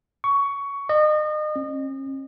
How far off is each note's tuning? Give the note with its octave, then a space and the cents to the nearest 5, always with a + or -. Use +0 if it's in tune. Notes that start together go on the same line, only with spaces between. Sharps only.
C#6 +15
D#5 -35
C#4 -45